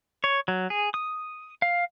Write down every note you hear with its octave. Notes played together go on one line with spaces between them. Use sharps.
C#5
F#3
G#4
D#6
F5